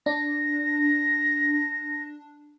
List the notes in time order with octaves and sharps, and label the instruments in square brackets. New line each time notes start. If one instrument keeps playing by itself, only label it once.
[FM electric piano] D4 [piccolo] A#6